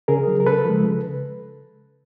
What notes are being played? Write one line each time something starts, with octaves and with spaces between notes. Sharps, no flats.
C#3 G#4 A#4
F#3
A#4
C#3 A4 B4
F3 G#3
C#3